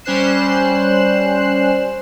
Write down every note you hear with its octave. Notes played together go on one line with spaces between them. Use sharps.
G3 C#4 C5 F#6 C7 E7